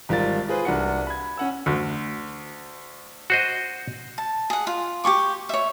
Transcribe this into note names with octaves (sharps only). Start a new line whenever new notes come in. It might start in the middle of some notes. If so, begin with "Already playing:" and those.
G#1 G3 F4 A#4 A6
F4 G#4 B4 C5
C2 D4 F#4 C#7
B5 G#6
C#4 F#5 E6
D2
F#4 C5 D#5
A5
G#4 F#5
F4
G4 G#5 C#6 D6
C#5 E5